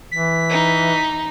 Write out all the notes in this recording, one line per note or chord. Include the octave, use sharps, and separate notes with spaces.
E3 B6
D#4